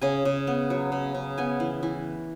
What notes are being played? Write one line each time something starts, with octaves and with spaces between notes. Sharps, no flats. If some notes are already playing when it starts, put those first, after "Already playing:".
C#3 G#5
C#3
B3
F#3
C#3
C#3
B3 G#5
E3
E3